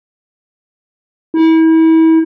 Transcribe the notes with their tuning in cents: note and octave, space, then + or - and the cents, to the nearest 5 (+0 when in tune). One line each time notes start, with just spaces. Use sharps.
E4 -35